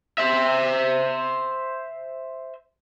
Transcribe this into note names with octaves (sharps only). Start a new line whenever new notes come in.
C5 E5